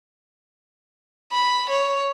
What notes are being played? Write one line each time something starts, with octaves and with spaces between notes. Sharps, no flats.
B5
C#5